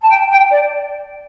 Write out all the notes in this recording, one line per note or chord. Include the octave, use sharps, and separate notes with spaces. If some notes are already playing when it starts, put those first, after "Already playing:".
A5
G5
G5
D5